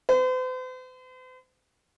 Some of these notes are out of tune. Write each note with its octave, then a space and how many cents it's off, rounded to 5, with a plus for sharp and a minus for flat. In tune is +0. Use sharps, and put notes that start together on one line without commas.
C5 -45